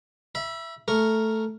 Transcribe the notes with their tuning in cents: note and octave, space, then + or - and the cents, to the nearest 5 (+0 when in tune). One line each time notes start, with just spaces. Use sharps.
E5 +15 B5 -30
A3 +0 A#4 +0 C#6 +0